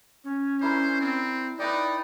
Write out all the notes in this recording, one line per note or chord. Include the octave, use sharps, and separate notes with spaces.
C#4
D4 E4 A#4 C5
C4
D#4 B4 D5 E5 G5